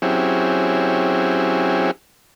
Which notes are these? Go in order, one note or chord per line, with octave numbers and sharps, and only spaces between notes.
F#3 C4 C#4 E4 G4 G#4